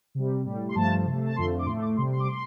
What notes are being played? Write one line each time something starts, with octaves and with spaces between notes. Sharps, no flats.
C3 G3
A2 G3
C6
G2 F3 A3 A5
C3 A3
A5
F2 D3 F3 A3 C6
D6
A2 A3 C6
D6
C3 G3 C6
C6
D6
C6